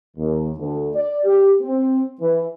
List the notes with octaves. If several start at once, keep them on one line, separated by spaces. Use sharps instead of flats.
D#2
D2
D5
G4
C4
E3